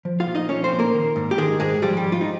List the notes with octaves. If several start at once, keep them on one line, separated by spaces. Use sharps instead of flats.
F3
F4 F5
A#2
D#4 D#5
F3 C#4 C#5
C4 C5
A#2
A#3 A#4
D#3
G#2
G4
D#3 G#3 G#4
G#2 G#3 G#4
F3 G3 G4
G3 G4
G#2
F4
D#4